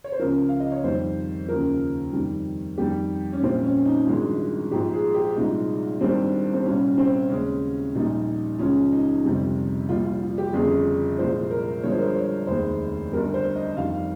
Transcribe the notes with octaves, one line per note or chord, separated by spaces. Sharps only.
C#5
C5
C#2 C#3 F3 A#4
F5
D#5
C#5
F2 D#3 G3 C5
D#2 C#3 F3 A#4
F2 D#3 G3
F2 D#3 G3 G4
C#4
A#1 A#2 G3 C4
C#4
D#4
G#1 G2 F3 G#3
A#1 G#2 F3 G4
G#4
G4
C2 A#2 F3 G#3 D#4
G#1 G2 D#3 G3 C4
C4
C2 A#2 G3 C#4
C4
D#2 C#3 G#3 C#4
A#1 A#2 G3 D#4
C#2 C#3 F3 G#3 C#4
D#4
G1 F2 C3 G3
A#1 A#2 G3 F4
F4
F4
G4
G1 F2 C#3 F3 G#4
C2 A#2 F3 G#3 C5
A#4
G1 G2 F3 G#3 C#5
C5
A#4
C5
C#5
F1 D#2 D#3 G#3 C5
G1 G2 G3 A#4
C5
D#5
F2 D#3 G3 F5